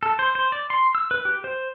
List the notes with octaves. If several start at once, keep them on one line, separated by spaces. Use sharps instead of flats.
A4
C5
C5
D5
C6
E6
B4
G4
C5